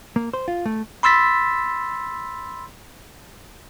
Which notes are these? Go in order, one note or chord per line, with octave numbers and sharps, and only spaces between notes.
A#3
C5
F4
A3
B5 C6 E6 A6 B6